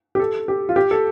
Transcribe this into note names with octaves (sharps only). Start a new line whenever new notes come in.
G4
A4
G4
F4
G4
A4